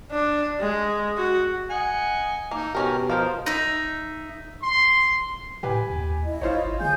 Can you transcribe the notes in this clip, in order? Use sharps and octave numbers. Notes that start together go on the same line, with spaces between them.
D4
G#3
F#4
D#5 F#5 G#5
A#3 D#4 E6
B2 D#3 C#4 G4 A#4
F3 A#4 C5 D#5 F5
D#4 E5
C6
A2 G4 B4 G#5
D#2
E4 D#5
G#1 F4 C5 C#5
D3 G#4 G#5 G6